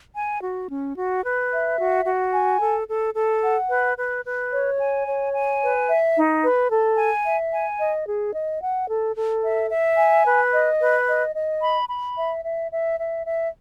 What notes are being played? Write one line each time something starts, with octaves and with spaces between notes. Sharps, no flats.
G#5
F#4
C#4
F#4
B4
E5
F#4
F#4
G#5
A4
A4
A4
F#5
B4
B4
B4
C#5
G#5
C#5
G#5
B4
E5
D#4
B4
A4
G#5
E5
G#5
D#5
G#4
D#5
F#5
A4
A4
E5
E5
G#5
B4
D#5
B4
D#5
D#5
B5
B5
E5
E5
E5
E5
E5